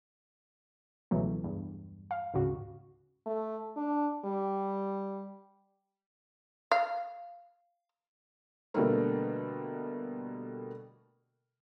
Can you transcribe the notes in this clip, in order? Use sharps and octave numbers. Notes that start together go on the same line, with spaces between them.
C#2 B2 E3 F#3 A3
E2 G2
F5
D2 G#2 C#3 F#4
A3
D4
G3
F5
B2 D3 G3 A3 A#3